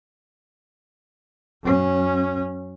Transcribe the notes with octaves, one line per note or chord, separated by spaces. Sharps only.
F#2 C#4